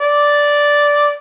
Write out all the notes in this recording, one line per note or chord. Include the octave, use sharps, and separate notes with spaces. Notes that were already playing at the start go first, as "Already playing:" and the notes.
D5